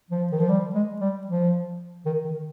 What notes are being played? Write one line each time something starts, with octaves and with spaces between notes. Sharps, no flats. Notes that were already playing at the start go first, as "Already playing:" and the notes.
F3
D#3
F3
G3
G#3
G3
F3
D#3
D#3